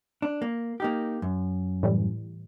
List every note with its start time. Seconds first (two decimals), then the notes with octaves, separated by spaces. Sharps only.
0.22 D4
0.42 A#3
0.80 A#3 D#4 G4
1.22 F#2
1.83 A2 E3 G3